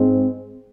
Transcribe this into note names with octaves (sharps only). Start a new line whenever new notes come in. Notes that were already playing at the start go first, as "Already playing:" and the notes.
Already playing: G#2 G#3 C4